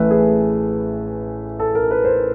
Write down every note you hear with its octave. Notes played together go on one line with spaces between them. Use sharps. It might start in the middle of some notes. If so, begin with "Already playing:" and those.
Already playing: A1 A2 E3 A3 B4
G#4
A4
A#4
B4
C5